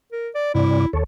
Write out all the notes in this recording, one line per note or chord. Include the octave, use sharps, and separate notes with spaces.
A#4
D5
G2 C3 E4 D5
D#2 A4 C#5